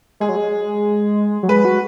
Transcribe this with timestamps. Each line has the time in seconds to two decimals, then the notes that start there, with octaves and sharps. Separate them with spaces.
0.20 G#3 G#4
0.29 F#3
0.36 G#3
1.43 F#3
1.49 G#3 B4
1.65 F#4